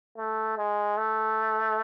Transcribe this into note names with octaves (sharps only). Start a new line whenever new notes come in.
A3
G#3
A3